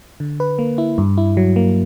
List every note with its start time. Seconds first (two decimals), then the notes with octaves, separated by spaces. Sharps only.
0.20 D3
0.40 B4
0.59 A#3
0.78 E4
0.98 G2
1.18 E4
1.37 F#3
1.56 A#3